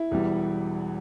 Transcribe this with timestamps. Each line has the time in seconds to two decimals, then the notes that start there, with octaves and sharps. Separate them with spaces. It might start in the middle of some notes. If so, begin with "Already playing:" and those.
Already playing: E4
0.11 E1 E2 E3 G3